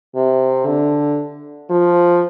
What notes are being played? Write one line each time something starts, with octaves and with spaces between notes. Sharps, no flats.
C3
D3
F3